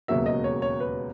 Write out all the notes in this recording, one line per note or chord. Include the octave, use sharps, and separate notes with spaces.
E1 D#2 C#3 F#3 A#3 E5
D#5
C#5
C#5
B4